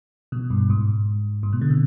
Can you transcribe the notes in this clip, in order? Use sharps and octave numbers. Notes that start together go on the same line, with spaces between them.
B2
G2
G#2
G#2
B2
D3
C3